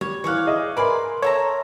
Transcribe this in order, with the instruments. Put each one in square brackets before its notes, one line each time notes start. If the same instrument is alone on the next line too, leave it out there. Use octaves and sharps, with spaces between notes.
[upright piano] G3 [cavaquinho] C#5
[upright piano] E3 F#6 [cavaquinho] C#5 D5 F5
[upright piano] G#4 D#5 E5
[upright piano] A#4 C6 [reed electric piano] B4 G#5 [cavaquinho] D5 B5
[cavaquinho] A4 E5 A#5 [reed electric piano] C#5